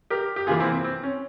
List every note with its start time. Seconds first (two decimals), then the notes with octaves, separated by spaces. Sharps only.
0.10 G4 A#4
0.36 G4
0.47 C3 E3 A#3 F4 G#4
0.60 C4 E4
0.72 C4
0.84 C4
1.03 C#4